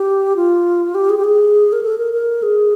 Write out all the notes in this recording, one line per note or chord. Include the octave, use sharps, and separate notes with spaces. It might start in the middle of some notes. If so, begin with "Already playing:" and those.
Already playing: G4
F4
G4
G#4
G4
G#4
A#4
A4
A#4
A#4
G#4